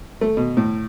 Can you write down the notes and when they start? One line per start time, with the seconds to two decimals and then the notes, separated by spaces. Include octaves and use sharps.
0.21 A3
0.37 B2
0.57 A2